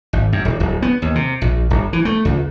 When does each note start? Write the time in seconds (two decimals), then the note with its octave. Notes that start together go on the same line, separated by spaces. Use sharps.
0.13 G#1
0.33 F#2
0.45 D#1
0.60 D1
0.82 B3
1.02 D#2
1.15 C3
1.42 A#1
1.70 G1
1.93 E3
2.05 A3
2.25 C#2